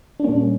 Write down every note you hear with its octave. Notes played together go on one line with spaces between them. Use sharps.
D4
A#2 G3 A#3 C#4